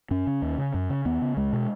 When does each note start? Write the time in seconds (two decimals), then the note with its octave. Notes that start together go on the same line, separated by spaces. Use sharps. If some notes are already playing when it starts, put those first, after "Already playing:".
0.11 F#2 C#4
0.27 C#3
0.42 D#2
0.58 C#3
0.74 F#2
0.90 C#3
1.05 D#2 B3
1.22 C#3
1.37 C#2 G#3
1.53 B2